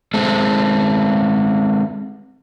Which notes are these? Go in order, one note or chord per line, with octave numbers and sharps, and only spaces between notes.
G#3 A3 C4 A4